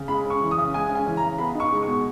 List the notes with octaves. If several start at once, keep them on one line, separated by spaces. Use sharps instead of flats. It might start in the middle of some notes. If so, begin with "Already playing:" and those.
Already playing: C#3
G#3 B5
C#4
C#6
E3
D#6
C#3
G#3 G#5
C#4
G#5
E3
A#5
C#3
B3 B5
D#4
C#6
G#3
B2 C#6